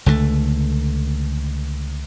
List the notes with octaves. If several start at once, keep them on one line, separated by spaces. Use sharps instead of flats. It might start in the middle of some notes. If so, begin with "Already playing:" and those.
C#2 D3 F3 A3